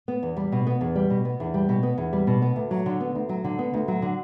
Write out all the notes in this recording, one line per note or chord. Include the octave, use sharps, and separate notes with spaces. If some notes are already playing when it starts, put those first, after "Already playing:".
B3
E2
G3
B2
B3
E2
G3
B2
B3
E2
G3
B2
B3
E2
G3
B2
B3
D2
F#3
D3
B3
D2
F#3
D3
B3
D2
F#3
D3